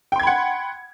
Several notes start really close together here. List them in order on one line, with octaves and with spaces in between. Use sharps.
G5 C6 G#6 B5 F#5